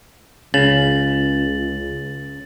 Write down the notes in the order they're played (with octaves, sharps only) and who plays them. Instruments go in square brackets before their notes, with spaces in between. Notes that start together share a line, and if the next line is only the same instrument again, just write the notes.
[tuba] C#2 [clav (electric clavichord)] C#3 [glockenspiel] A6 F#7